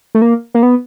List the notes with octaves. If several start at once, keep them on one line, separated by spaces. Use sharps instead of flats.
A3
A#3
A#3
B3